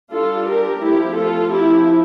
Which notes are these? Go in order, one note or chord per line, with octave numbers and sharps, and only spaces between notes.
G3 D4 F4 A4
G4 A#4
F3 A3 C4 E4 G4
F4 A4
F3 C4 E4 G4